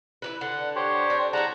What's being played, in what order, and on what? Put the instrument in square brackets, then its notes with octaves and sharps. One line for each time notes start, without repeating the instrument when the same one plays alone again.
[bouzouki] E4 G4 B4
[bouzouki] D3 [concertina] F#5
[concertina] G4 C5 C#5
[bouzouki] C4 D4
[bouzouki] G#3 E4 C#5 [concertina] F#5 A5 A#5